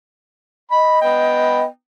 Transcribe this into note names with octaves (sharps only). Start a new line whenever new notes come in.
D#5 B5
B3 G5